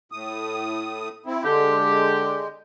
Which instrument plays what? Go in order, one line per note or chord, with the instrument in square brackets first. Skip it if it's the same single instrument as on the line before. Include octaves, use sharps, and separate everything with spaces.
[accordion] A2 D#6
C4 E4
[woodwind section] D3 G4 [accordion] G#3